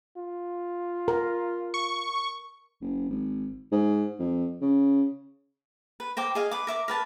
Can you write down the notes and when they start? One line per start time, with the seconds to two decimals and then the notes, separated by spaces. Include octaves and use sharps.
0.17 F4
1.08 A#4
1.74 C#6
2.81 F#1
3.09 G#1
3.72 G#2
4.19 F2
4.61 C#3
6.00 B4
6.17 A#4 C5 G5 D6
6.35 G#4 D#5 F5
6.51 B4 D6
6.67 A#4 E5 D6
6.88 A#4 B4 A5